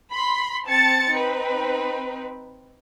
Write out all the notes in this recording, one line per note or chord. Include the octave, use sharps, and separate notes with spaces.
B5 C6
C4 A5 A6 C#7
C4 D#4 B4